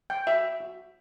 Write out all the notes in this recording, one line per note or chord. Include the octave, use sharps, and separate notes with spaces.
G5
F#4 E5
F#4